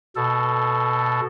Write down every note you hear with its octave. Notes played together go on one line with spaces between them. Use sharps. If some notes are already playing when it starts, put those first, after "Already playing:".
B2 A4